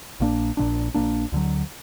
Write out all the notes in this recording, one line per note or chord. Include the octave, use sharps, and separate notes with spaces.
A#1 A#2 A#3 D4
A#1 A#2 A#3 D4
A#1 A#2 A#3 D4
D2 D3 F#3